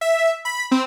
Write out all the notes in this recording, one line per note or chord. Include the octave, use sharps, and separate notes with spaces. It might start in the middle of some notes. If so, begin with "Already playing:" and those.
E5
B5
C4